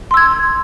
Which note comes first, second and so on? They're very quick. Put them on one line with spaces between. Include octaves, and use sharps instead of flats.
C6 E6 G#6